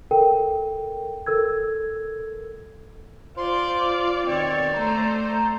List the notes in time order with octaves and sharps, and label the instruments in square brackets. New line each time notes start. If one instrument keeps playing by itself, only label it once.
[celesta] A4 A#4 G5
A4 A#4 E6 G#6
[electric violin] F4 D5 [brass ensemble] C5 [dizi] C6
[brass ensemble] B2 D#3 [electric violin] C4 C#5 [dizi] D5
[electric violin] A3 C5 [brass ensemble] A#5